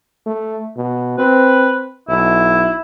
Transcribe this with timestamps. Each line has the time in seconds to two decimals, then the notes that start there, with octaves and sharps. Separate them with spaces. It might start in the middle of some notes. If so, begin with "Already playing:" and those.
0.26 A3
0.77 B2
1.18 C4 B4
2.08 B1 E4